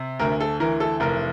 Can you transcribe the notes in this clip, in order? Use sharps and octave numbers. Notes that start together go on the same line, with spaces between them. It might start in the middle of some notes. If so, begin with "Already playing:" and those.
Already playing: C3
D2 A#4
A4
E3 A#4
A4
F1 A#4